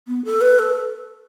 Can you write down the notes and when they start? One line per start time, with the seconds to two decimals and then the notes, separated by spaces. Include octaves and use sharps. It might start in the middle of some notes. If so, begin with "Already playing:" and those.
0.08 B3
0.25 A4
0.41 B4
0.59 A4